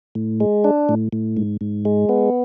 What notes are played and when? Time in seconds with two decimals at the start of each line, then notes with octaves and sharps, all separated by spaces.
0.15 A2
0.40 G#3
0.64 D4
0.89 A2
1.13 A2
1.37 G#2
1.61 G#2
1.85 G#3
2.09 B3